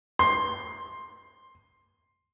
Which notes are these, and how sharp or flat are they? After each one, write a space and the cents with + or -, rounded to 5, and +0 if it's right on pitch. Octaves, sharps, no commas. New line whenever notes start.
C6 +10